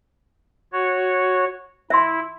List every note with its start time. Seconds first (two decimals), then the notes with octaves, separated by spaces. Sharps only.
0.73 F#4 C#5
1.90 E4 E5 C6